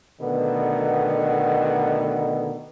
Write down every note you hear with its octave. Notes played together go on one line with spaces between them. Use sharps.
B2 D3 D#3 A3 B3